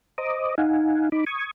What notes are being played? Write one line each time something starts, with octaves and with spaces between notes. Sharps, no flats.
C5 D#5 A#5 D6 D#6
D#4 F5 F#5 G#5
D#4 B5 D6
C#6 D#6 G#6